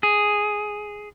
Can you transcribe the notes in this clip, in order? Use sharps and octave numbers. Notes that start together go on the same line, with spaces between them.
G#4